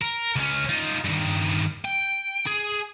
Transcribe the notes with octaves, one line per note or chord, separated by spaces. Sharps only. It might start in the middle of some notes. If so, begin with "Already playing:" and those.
A#4
C#2 C#4
D#4 F4
G2 D#3
G5
G#4